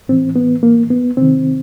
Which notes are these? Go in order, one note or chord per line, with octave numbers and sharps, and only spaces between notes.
A2 E3 C4
B3
A#3
B3
C3 D#3 C4